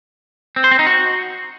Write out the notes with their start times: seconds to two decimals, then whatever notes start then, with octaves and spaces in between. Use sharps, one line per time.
0.56 C4
0.64 C5
0.71 C4
0.79 D#4
0.86 F#4